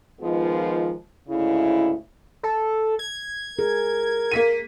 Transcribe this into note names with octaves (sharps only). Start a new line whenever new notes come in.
D#3 F3 G#3 B3 D#4 F4
D2 G#2 C#3 E4
A4
G#6
G#4 A#4
A#3 B6 D#7